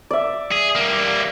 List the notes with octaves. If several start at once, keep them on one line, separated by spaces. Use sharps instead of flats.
D5 E5
G#4
G3 A#3